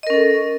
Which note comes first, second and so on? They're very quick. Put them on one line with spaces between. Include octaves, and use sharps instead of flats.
D#5 A#4 C#4 A4